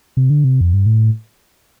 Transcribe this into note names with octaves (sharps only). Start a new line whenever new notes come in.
C3
D3
C3
F2
G2
A2